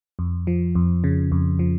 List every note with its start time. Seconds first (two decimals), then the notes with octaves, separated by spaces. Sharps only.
0.19 F2
0.47 F3
0.75 F2
1.04 C#3
1.32 F2
1.59 F3